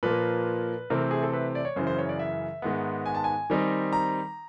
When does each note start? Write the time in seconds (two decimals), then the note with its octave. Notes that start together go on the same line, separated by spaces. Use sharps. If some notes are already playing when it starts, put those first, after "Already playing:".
0.03 A#2 F3 A#3 B4
0.90 C3 E3 A3 C4 A#4
1.11 G#4
1.23 A4
1.33 B4
1.55 D5
1.65 C#5
1.76 F#2 C#3 E3 C5
1.87 C5
1.98 C#5
2.09 D5
2.19 E5
2.62 G#2 D#3 G#3 B3
3.06 G#5
3.15 A5
3.24 G#5
3.50 D#3 G3 C4 D#4
3.93 A#5